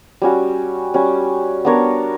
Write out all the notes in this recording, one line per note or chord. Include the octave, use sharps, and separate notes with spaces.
G3 C#4 F#4
G3 C#4 F#4
B3 D4 A#4 C#5